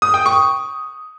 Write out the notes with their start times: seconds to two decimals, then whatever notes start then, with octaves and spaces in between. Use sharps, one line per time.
0.02 D#6
0.14 G5
0.26 C#6